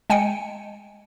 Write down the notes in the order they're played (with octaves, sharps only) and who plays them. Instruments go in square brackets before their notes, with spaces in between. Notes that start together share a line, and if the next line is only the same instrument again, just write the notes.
[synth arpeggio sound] G#3 G5 G#5 C#7